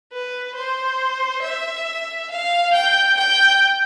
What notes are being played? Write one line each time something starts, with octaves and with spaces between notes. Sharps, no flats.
B4
C5
E5
F5
G5
G5